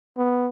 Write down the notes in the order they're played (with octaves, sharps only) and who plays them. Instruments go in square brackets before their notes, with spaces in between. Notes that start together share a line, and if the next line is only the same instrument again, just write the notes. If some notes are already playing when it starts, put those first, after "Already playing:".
[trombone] B3